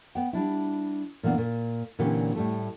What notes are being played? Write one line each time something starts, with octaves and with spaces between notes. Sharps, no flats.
B3 G5
G3 D4 E4
A#2 E3 A#3 B3 D4
A#2
A#2 D3 E3 C4 C#4 G4
A2 G3 A3